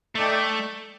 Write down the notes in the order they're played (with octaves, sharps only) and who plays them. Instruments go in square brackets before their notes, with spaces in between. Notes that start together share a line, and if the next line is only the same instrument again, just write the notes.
[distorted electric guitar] A3 [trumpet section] D#4 A4 D5 G5